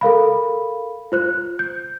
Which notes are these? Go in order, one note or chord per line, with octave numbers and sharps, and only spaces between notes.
A4 A#4 F5 B5
F4 C5 F#6
G6